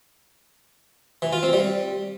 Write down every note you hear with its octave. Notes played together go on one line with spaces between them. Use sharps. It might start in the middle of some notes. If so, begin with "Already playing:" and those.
E3
F4
C4
G3